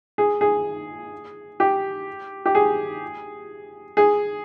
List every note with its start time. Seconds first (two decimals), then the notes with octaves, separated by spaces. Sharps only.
0.18 G#4
0.41 G#4
1.60 G4
2.46 G4
2.55 G#4
3.97 G#4